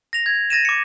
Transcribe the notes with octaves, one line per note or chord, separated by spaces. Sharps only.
A#6 F7
G#6
A6 A#6 D#7 E7
D6 C#7